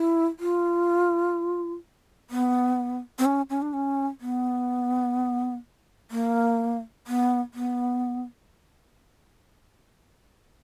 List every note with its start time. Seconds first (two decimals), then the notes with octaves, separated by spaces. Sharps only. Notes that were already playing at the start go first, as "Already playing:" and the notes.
Already playing: E4
0.40 F4
2.30 B3
3.19 C4
3.25 C#4
3.50 C#4
3.62 D4
3.73 C#4
4.21 B3
6.11 A#3
7.07 B3
7.54 B3